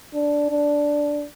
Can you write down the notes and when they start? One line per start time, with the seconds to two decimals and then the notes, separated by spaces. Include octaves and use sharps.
0.14 D4
0.50 D4